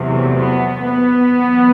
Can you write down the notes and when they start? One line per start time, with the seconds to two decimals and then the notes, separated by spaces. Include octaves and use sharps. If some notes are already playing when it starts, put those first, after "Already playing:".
Already playing: E2 C3 F#3
0.08 A3
0.38 B3
0.82 B3
1.26 E2 B2 F#3